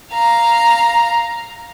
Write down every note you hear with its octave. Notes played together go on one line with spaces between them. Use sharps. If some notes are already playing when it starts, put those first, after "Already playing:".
F5 A#5